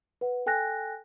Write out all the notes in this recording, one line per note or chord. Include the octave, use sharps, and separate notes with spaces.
B4 F#5
A4 G5 G#5 F#6 A#6